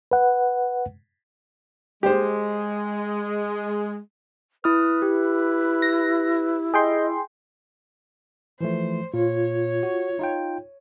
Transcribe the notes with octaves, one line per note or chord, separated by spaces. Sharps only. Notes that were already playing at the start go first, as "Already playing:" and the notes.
B4 F#5
G#3 G4 C5
E4 B4 D#6 F6
E4 G4
A#6
G#4 D#5 G5 C6
E3 F3 A3 C5
A#2 F4 C#5
F#4
D#4 F4 G5